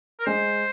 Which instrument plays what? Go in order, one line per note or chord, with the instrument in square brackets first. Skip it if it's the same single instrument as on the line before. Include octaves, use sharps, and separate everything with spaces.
[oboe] A#4
[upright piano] G#3 [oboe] C5